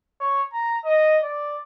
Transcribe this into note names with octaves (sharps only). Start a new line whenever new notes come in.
C#5
A#5
D#5
D5